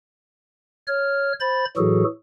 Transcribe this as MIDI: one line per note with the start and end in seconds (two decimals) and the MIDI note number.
0.88 1.33 73
0.88 1.33 89
1.40 1.65 72
1.40 1.65 83
1.40 1.65 93
1.77 2.04 45
1.77 2.04 52
1.77 2.04 54
1.77 2.04 66
1.77 2.04 68
1.77 2.04 69